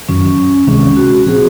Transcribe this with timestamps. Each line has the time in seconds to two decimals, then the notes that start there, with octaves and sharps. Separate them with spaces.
0.08 F#2 D#3 F#3 C#4
0.67 C#2 C3 D#3 G#3 C#4
0.97 F#4
1.26 A#2 F3 C4 F#4 G#4